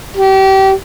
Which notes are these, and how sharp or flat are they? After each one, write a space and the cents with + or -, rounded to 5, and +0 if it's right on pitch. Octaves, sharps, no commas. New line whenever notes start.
G4 -30